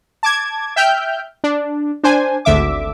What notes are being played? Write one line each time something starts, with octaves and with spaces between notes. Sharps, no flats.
A5 D6 G#6
E5 G5 F6 G6
D4
D4 C5 G#5
G#1 D2 D3 E5 D6